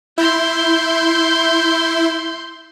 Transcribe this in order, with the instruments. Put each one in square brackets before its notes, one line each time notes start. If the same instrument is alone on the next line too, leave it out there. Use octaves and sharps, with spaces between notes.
[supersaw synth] E4 [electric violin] C6 G6